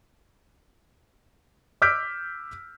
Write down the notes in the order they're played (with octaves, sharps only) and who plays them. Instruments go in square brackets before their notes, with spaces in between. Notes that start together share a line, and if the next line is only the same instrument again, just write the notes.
[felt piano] D6 E6 F6 G6 B6 D7